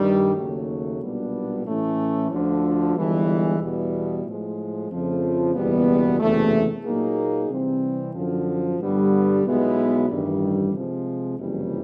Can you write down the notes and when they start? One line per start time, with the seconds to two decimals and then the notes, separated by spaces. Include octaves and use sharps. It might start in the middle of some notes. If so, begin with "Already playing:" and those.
Already playing: G2 D#3 G3
0.35 D#2 C#3 F#3 A3
1.00 B1 A#2 G3 B3 D4
1.65 A2 E3 A3 C#4
2.31 D2 D3 F3
2.95 G1 G2 E3 G#3
3.59 E2 B2 G3 B3 E4
4.24 A2 F3 G#3
4.90 F2 C#3 F3 A3
5.54 F#1 E2 B2 G3 B3
6.20 F#1 E2 C3 E3 A3
6.84 A#2 F#3 A#3 D#4 G#4
7.49 C3 E3 G3 C4
8.14 F#2 D3 F3
8.79 G2 D3 G3 B3
9.43 B1 B2 G#3 B3 E4
10.08 A1 G2 D#3 G3
10.73 C3 F3 G#3
11.38 F#1 F2 C3 E3 G3